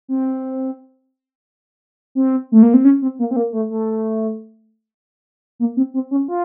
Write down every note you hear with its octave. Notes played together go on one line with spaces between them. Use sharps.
C4
C4
A3
A#3
C4
C#4
C4
A#3
C4
A#3
A3
A3
A#3
C4
C4
C#4
F4